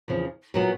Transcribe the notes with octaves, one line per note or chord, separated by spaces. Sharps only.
E2 C#3 F3
A#2 F#3 B3